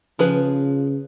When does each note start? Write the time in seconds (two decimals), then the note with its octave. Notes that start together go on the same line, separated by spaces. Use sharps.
0.19 C#3 F3 G#4 B4